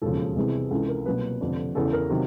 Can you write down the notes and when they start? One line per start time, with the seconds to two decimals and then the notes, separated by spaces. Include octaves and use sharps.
0.02 E1 D#2 C#3 F3 A4
0.36 C2 C3 E3 G#3 B3
0.71 C#2 C3 E3 A4
0.88 A#4
1.06 C2 B2 F#3 A#3 B4
1.41 F1 F2 D3
1.75 E2 C#3 E3 A4
1.93 A#4
2.10 C3 D#3 F#3